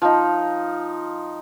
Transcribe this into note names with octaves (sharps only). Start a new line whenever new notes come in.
F3 D#4